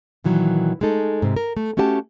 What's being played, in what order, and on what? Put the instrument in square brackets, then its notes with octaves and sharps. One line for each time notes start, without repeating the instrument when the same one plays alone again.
[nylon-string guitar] A#2 D#3 E3 F#3
G#3 A3 D#4 A4
G#2 C3 C4
A#4
A3
A3 C#4 F#4 G4 G#5 A5